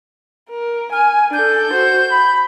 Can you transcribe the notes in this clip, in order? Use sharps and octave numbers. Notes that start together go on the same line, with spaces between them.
A#4
G#5 F6
D4 A4 G6
F#4 C5
B5